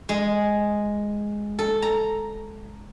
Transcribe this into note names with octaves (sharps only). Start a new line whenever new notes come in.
G#3
A4
A#5